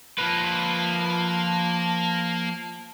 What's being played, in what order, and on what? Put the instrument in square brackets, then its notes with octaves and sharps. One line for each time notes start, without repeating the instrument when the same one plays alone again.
[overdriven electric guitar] F3 B4 [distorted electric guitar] A#3 [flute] A5